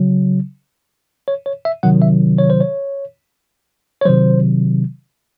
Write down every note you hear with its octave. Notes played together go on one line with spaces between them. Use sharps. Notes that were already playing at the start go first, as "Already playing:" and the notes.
Already playing: C#3 F#3
C#5
C#5
E5
C3 D#3 F#3 F#5
E5
C#5
C5
C#5
C#5
C3 D#3 F#3 C5